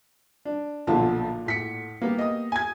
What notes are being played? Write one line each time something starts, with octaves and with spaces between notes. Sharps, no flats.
D4
B1 A#2 D3 F3 A5
A2 B6 C#7
A#3 B3 G4
D#5 D#6
G#5 G#6